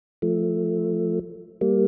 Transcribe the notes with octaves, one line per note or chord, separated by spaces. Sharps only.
F3 A3
G3 A#3